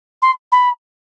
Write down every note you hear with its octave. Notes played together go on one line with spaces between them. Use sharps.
C6
B5